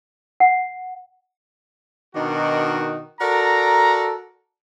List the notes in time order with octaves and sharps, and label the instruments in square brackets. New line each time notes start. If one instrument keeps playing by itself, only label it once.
[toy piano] F#5
[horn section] B2 D#3 D4 D#4 F#4 A#4
F#4 A4 A#4 D5 A#5